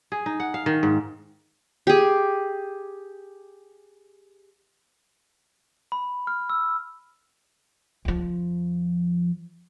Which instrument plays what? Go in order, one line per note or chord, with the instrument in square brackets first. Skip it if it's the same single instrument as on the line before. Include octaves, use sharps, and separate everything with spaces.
[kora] G#4
D#4
F#5
F5
D#3
G#2
[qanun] G4 G#4
[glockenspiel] B5
F6
E6
[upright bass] F2 F3